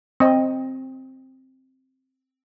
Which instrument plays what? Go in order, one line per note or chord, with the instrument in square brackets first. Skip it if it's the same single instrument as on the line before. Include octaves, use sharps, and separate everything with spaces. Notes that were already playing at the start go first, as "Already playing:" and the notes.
[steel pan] C4 D#5